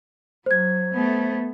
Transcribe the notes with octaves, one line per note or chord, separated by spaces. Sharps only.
F#3 C5 G#6
A3 B3